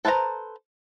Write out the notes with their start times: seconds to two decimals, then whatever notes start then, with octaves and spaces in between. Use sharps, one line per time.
0.05 A4 B4 C5 E5 A#5